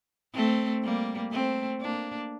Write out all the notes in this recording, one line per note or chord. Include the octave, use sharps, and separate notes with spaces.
A3 C4
G3 A#3
A3 C4
A#3 D4